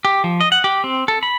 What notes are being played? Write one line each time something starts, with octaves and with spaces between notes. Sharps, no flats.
G4
F3
D#5
F#5
G4
C4
A4
B5